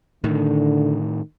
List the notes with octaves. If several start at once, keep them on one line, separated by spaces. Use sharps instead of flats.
A2 D3 D#3